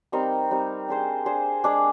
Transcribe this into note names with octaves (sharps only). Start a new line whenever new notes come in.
G3 C4 D#4 A#4
G3 C4 D#4 A#4
D4 G#4 C5
D4 G#4 C5
G#3 D4 G#4 D5